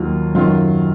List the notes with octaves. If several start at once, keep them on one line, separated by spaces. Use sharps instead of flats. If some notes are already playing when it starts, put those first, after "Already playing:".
Already playing: D#2 D#3 F#3 F4
F#2 D#3 F#3 F4